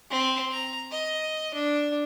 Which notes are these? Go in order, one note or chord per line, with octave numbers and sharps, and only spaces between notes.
C4
A#5
D#5
D4